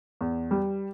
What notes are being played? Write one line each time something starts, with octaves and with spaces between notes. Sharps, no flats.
E2
G3